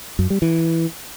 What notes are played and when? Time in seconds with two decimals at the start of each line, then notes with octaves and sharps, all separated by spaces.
0.19 F#2
0.30 G3
0.42 E3